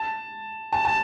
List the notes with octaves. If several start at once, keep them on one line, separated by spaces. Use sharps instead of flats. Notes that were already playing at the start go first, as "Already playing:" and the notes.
Already playing: A5
A5
A5